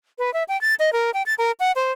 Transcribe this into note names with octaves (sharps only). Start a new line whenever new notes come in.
B4
E5
G5
A6
D#5
A#4
G5
A6
A#4
F#5
C5